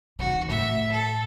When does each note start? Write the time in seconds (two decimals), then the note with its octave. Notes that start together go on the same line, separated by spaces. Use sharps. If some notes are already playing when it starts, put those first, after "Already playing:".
0.19 D3 D#3 F#4
0.50 A2 E5
0.91 A4